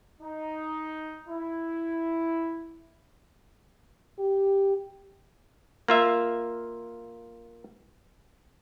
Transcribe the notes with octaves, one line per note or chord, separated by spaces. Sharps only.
D#4
E4
G4
A#3 F4 E5